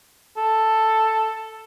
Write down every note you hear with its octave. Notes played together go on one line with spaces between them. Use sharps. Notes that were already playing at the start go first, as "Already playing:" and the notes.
A4